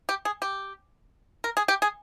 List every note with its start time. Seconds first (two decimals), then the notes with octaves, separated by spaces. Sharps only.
0.09 G4
0.25 G#4
0.42 G4
1.44 A#4
1.57 G#4
1.68 G4
1.82 G#4